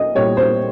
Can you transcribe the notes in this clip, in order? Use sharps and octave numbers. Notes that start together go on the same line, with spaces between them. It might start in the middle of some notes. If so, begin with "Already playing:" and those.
Already playing: C2 D#5
A#2 G3 C#5
C5